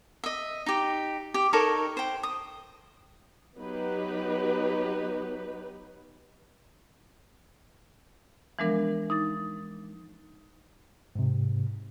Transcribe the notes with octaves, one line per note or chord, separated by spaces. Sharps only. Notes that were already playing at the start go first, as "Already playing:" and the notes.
D#5 E5
D#4 G4
G4
D#4 A4 A#4 C#5
C5 G5
D#6
F#3 B3 D#4 G4 B4
E3 F3 G#3 B3 D4 A#4
D#4 D6 A6
G#2 C3